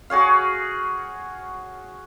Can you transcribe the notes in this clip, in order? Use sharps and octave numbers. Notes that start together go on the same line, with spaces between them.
F#4 G#4 C#5 F5